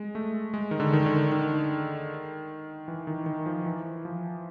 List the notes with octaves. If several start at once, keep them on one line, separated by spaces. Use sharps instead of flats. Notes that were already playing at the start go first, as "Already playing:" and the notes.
Already playing: G#3
A3
G#3
D#3
D3
D#3
D3
D#3
E3
D#3
D#3
F3
E3
F3